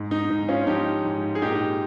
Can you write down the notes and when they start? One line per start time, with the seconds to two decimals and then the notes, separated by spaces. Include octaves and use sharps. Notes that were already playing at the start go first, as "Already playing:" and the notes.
Already playing: G#2
0.11 D#4
0.30 G#2 D#4
0.48 C#4 F4
0.67 F3 D#4 G4
1.05 G#2
1.35 G#4
1.42 A#2 D#4 G4